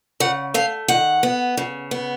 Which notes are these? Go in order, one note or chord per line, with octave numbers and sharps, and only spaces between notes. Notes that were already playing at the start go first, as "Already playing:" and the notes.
C#3 F#5
A3 F5
D#3 F#5
B3
C#3
B3